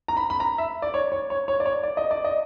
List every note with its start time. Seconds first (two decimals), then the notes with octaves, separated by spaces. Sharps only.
0.08 A#5
0.17 B5
0.30 B5
0.40 A#5
0.58 E5
0.82 D5
0.94 C#5
1.12 C#5
1.30 C#5
1.48 C#5
1.60 D5
1.66 C#5
1.83 D5
1.97 D#5
2.11 D5
2.24 D#5